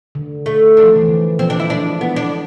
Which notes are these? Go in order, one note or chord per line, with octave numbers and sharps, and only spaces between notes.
D3
A3
D4
F3
E3
D3
F3 C4
D4
E4
G#3 D4
B3
D4